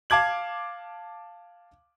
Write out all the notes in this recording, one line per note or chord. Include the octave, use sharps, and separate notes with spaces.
F5 A5 D6 G#6 F#7